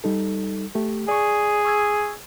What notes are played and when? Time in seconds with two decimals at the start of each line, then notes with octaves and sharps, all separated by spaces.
0.04 G3 D#4 A4
0.75 A3 G4
1.08 G#4 D5 C#6
1.65 C#6 E6 G#6